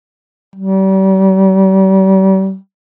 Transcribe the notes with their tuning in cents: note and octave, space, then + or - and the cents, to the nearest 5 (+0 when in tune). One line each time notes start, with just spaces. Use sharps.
G3 -40